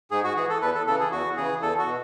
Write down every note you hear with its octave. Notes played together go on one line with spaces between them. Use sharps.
G#2 G#4
F#4
E3 G#4
A4
E2 B4
A4
C#3 E3 A4
G#4
E2 F#4
C#3 E3 G#4
E2 A4
F#4
B2